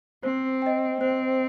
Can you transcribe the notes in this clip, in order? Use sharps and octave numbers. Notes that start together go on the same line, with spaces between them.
C4 C5
D#5 G5
C4 C5